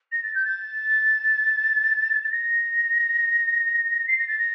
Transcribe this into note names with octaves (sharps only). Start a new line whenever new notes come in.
A#6
A6
G6
A6
A6
A#6
C7
A#6
A6
A#6